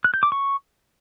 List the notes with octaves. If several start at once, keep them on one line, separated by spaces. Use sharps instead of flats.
F#6
G6
D6
C#6